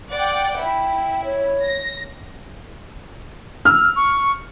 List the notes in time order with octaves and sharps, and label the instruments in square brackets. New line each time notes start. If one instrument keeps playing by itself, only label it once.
[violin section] D5 F#5 G5
[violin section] E4 [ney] G5
[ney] C#5
[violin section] A#6
[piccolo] E6 [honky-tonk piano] F6
[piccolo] C#6